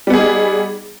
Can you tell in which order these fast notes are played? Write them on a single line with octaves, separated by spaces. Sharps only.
G3 B3 G#4 D#4